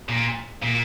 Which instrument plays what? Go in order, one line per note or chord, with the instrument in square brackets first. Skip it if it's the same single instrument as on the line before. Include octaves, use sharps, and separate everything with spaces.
[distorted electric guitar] A#2
A#2